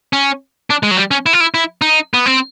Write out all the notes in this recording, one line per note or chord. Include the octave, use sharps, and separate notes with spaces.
C#4
D4
G#3
F#3
G3
C#4
E4
F4
E4
E4
D#4
B3
C4